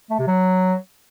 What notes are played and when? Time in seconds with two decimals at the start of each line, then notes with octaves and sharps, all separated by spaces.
0.11 A3
0.19 C3
0.28 F#3